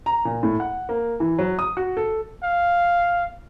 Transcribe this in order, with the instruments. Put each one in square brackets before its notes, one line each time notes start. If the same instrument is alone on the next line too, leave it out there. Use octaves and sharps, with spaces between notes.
[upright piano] A#5
A#2
A2
F#5
A#3
E3
F#3
D#6
F#4
A4
[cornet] F5